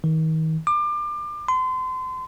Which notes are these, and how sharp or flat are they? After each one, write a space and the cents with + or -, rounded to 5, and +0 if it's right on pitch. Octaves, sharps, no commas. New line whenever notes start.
D#3 +35
D6 +30
C6 -35